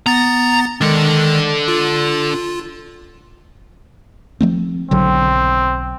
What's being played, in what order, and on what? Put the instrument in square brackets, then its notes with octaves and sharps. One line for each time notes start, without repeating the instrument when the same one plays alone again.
[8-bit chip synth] B3 A6 [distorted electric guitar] A#5
[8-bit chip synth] D#3 G#3 [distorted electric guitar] D4 A4
[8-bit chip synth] F4
[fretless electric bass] F3 A3 C4
[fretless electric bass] B1 D3 F#3 [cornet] C4